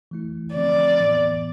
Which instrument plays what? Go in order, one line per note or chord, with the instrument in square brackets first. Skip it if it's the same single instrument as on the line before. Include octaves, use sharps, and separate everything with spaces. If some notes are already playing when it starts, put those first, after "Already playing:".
[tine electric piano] E3 A3 E4
[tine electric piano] D3 F3 A3 C4 [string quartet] D5
[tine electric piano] A2 E3 B3